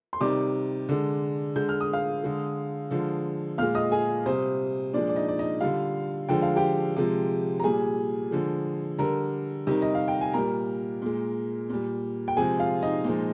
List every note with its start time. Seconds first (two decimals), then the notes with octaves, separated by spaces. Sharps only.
0.13 C6
0.20 C3 D#3 G3 D5 D6
0.89 D3 G#3
1.56 D3 G#3 G6
1.69 F6
1.81 D#6
1.93 F5 F6
2.24 D3 G#3
2.91 D3 F3 G#3
3.58 A#2 G#3 F5 F6
3.75 D#5 D#6
3.92 G#4 G#5
4.26 C3 G3 C5
4.94 A#2 F3 G#3 D4 D5
5.09 D5
5.16 D#4 D#5
5.28 D5
5.39 D#4 D#5
5.61 D3 G3 F4 F5
6.29 D3 F3 G#3 G5
6.42 F5
6.56 G4 G5
6.96 C3 F3 G#3
7.60 A#5
7.63 A#2 G3 G#4 G#5
8.31 D3 F3 G#3
8.99 D3 G3 A#4 A#5
9.67 C3 D#3 G3
9.82 D#5
9.95 F5
10.08 G5
10.21 G#5
10.34 A#2 G3 A#4 A#5
11.02 A#2 G#3
11.70 A#2 G3
12.28 G5
12.37 C3 F3 G#3 G#4 G#5
12.59 F4 F5
12.82 D#4 D#5
13.04 A#2 F3 G#3